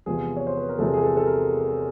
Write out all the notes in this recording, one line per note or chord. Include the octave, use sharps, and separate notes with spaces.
E2 C3 F3 G#3 B3 G#4
C#5
C5
B4
A#4
E2 C3 F3 G#3 B3 A4
G#4
A4
A4
A#4